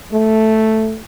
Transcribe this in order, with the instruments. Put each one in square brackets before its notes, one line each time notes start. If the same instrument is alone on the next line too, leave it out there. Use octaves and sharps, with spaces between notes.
[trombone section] A3